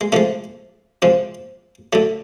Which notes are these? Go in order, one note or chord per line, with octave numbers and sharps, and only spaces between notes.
G#3
C3 F3 G#3 A3
C3 F3 G#3
D3 F#3 A3